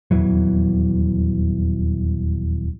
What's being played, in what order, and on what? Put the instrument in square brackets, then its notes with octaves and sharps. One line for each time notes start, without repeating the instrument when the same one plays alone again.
[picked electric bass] D#1 E2 E3 F#3